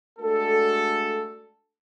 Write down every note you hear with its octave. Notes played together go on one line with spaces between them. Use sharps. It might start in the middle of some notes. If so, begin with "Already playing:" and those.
G#3 A3 D4 F#4 A4